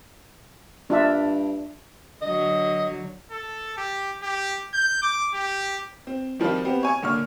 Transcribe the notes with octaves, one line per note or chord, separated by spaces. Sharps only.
G2 D4 F4 E5
D3 F#3 D#5
A4
G4
G4
G6
D6
G4
C4
D#3 F3 G3 C4 F4
B3 C4 G4
C#5 G#5 C#6
A#2 D3 C#5 F6